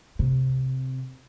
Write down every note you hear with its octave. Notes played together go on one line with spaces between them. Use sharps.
C3